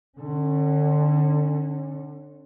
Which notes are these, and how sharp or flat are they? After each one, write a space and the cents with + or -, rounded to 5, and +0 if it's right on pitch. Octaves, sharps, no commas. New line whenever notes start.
D3 +25 C#4 -25